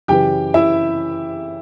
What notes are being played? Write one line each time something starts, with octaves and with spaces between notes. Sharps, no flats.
F#2 C#3 E3 G4 G5
E4 E5